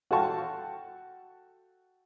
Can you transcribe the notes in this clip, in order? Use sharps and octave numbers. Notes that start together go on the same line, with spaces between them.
F#4 A4 F5 G5 A5 C#6